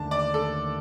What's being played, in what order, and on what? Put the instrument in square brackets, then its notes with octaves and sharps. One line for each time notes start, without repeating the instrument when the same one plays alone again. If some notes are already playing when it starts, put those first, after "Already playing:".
Already playing: [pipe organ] D#2 D3 A3 D4 [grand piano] A5
[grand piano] D5
A4